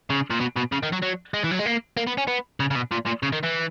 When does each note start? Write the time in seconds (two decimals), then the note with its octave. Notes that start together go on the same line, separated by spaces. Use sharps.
0.10 C#3
0.30 A#2
0.40 B2
0.56 B2
0.72 C#3
0.83 D#3
0.92 F#3
1.03 F#3
1.34 G#3
1.44 E3
1.51 F#3
1.59 G#3
1.66 A#3
1.97 A#3
2.07 B3
2.18 C#4
2.28 B3
2.60 C#3
2.71 C#3
2.75 B2
2.91 A#2
3.06 A#2
3.23 C#3
3.33 D#3
3.44 E3